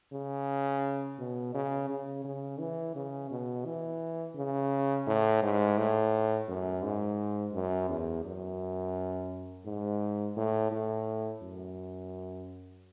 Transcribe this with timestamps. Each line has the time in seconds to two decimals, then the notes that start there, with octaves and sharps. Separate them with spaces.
0.13 C#3
1.19 B2
1.54 C#3
1.89 C#3
2.24 C#3
2.59 E3
2.95 C#3
3.31 B2
3.65 E3
4.35 C#3
5.07 A2
5.43 G#2
5.78 A2
6.48 F#2
6.83 G#2
7.53 F#2
7.89 E2
8.25 F#2
9.65 G#2
10.36 A2
10.71 A2
11.42 F#2